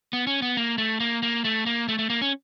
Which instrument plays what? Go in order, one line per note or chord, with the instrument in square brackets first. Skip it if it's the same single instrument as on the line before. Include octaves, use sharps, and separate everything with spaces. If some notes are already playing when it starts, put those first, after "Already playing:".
[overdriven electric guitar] B3
C#4
B3
A#3
A3
A#3
A#3
A3
A#3
A3
A3
A#3
C#4